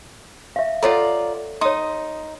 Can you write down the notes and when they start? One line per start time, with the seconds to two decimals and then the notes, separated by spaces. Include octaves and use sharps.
0.56 E5 F5
0.83 F4 A4 C#5 D5 F#5 A#5
1.61 D#4 C#5 C6 D#6